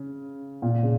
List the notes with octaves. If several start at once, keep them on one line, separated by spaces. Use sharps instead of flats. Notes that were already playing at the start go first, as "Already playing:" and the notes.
Already playing: C#3
A#2
C#3